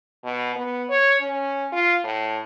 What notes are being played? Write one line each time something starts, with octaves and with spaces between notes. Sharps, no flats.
B2
B3
C#5
C#4
F4
A2